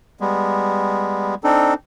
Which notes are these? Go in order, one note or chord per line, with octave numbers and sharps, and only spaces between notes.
G3 G#3 B3
C4 D4 D#4 A4